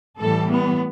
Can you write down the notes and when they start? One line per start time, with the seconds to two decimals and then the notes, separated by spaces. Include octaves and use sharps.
0.19 A2 E3 G3 A4
0.50 B3